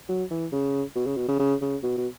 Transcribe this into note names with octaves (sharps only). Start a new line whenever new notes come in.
F#3
E3
C#3
B2
C#3
B2
C#3
C#3
C#3
B2
B2